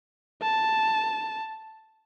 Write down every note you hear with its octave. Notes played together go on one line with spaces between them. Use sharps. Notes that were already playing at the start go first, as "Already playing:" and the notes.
A5